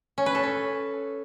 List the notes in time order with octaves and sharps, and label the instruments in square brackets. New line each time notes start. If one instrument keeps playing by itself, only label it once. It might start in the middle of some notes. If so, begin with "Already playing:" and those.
[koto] C#4
B4
A4
C#4